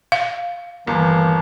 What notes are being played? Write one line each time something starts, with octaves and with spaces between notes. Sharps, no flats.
F5
G1 D#2 E3 A#3